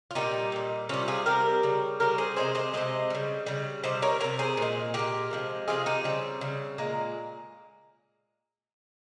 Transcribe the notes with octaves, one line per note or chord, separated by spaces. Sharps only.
F4
A#2 G3 D#4 G4
A#2 G3
C3 G3 C#4 F4
F4 G#4
C3 G3 G4 A#4
C#3 G3
C#3 G3 G4 A#4
G#4 C5
C3 D#3 G#3 G#4 C5
C5 D#5
C3 D#3 G#3 C5 D#5
C#3 G3
C#3 G3
C3 G3 C5 D#5
A#4 C#5
C3 G3 A#4 C#5
G#4 C5
A#2 G#3
A#2 G#3 G4 A#4
C3 F3 G#3
C3 F3 G#3 F4 G#4
D#4 G4
C#3 G3 C4
C#3 G3
A#2 G#3 A#3